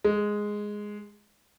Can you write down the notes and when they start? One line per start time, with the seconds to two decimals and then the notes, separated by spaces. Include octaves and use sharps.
0.05 G#3